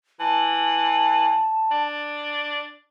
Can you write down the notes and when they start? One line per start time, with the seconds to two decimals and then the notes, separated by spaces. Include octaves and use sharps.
0.20 E3 A5
1.71 D4